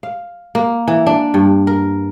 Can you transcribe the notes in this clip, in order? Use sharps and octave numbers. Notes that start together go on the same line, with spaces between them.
F5
A#3
E3
D4
G2
A#4